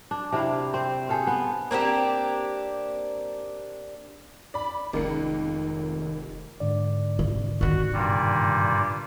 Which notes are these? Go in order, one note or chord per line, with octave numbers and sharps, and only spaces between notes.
D4
C3 D4 E4 F5
C4 C5
G#4 A4 C5 F5
B3
A#3 C4 D4 G4
D5 B5
F1 C#2 D#3 A#3 C#7
G#2 D3 D5
C3
C3 D#3 F#4
G2 A#2 G3